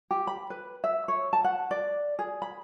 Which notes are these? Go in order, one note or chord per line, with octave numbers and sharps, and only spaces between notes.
G4
B5
B4
E5
C#5
A5
F#5
D5
G#4
B5